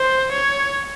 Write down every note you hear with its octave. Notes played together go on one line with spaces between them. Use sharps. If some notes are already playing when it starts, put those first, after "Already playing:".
Already playing: C5
C#5